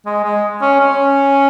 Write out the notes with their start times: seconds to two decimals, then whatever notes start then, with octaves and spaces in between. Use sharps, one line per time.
0.06 G#3
0.24 G#3
0.62 C#4
0.80 C#4